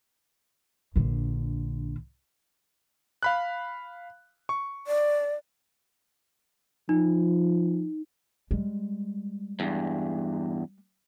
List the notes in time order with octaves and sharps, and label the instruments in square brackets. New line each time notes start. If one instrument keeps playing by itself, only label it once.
[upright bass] A#1 D3
[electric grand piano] F5 B5 F#6
C#6
[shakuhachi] D5
[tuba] F3 [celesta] D#4
[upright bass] G3 G#3
[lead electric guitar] E2 G2